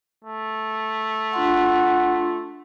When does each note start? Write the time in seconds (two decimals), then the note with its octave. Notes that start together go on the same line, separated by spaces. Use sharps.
0.24 A3
1.34 D4 F4 F#5 C6